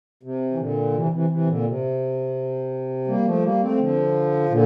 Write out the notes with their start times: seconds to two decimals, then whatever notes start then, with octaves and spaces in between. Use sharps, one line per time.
0.23 C3
0.52 E3
0.58 A#2 D3
0.94 C3 E3
1.12 C3 E3
1.30 C3 E3
1.47 A#2 D3
1.65 C3
3.07 G3 A#3
3.25 F3 A3
3.43 G3 A#3
3.61 A3 C4
3.78 D3 F3
4.49 A#2 D3